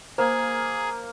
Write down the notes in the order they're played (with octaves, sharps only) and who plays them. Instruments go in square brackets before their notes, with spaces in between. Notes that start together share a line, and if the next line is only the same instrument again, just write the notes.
[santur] A#3 [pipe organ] G#4 [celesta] C5